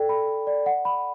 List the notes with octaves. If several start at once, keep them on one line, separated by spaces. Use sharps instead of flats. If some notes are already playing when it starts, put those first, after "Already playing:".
Already playing: A4 D5 G5
B5
A4
D5
F#5
B5